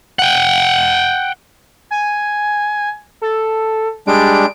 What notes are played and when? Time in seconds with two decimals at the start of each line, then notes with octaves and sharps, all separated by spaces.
0.19 F#5 G5
1.91 G#5
3.22 A4
4.07 G3 G#3 D4 D7